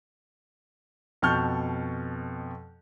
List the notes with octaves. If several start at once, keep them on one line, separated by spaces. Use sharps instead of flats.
F2 B2 A5 C#6 F6 G6